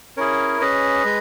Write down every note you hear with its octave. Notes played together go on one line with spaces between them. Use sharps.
C#4 E4 G#4 A#4 C#5
C#4 G#4 B4 D#5
G#3